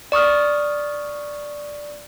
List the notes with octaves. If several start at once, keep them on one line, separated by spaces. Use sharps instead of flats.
D5 C#6 D#6 F6